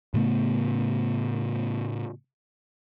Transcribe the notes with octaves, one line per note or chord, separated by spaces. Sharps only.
A2 C#3 A3 B3